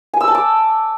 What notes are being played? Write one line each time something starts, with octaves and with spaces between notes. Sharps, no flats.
G#5
E6
A5
D6